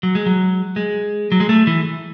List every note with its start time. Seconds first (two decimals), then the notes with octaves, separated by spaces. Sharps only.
0.03 F#3
0.15 G#3
0.26 F#3
0.76 G#3
1.32 F#3
1.40 G#3
1.49 A3
1.67 E3